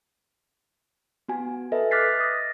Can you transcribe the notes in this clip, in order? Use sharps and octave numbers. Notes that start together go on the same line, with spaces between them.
B3 F#4 G#5
A4 B4 D#5 E5
D6 F6 F#6 A6 B6 C7
D#6 A#6